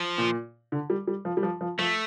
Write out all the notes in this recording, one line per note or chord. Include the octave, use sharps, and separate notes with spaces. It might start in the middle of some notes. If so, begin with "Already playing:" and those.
Already playing: F3
A#2
D3
G3
G3
F3
G3
F3
F3
F3 A3